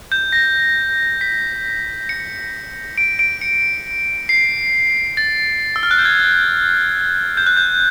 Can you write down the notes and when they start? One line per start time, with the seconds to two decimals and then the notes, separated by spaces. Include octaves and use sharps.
0.12 G6
0.32 A#6
1.21 B6
2.09 C#7
2.98 D7
3.19 D7
3.41 C#7
4.29 C7
5.17 A6
5.76 E6
5.83 F6
5.91 F#6
5.98 G6
6.05 G#6
7.37 G6
7.47 F#6
7.57 G6